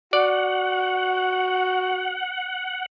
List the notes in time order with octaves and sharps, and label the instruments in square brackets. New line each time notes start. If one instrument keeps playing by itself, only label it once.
[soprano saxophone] F#4 [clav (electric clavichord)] D5 [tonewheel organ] F#5